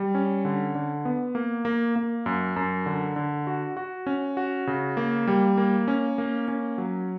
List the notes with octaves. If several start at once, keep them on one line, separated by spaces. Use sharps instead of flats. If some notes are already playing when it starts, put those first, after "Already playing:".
Already playing: G3
C#4
D3
D3
B3
A#3
A#3
A#3
F#2
F#2
D3
D3
F#4
F#4
C#4
F#4
C#3
A#3
G3
A#3
C#4
A#3
C#4
F#3